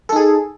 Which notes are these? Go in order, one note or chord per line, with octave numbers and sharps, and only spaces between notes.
D#4 G#4 A4